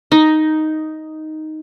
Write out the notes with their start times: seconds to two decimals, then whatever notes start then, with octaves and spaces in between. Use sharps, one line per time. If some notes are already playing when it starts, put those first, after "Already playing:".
0.12 D#4